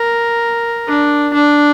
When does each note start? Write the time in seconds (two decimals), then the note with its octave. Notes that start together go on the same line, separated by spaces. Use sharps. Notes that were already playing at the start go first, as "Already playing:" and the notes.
Already playing: A#4
0.88 D4
1.34 D4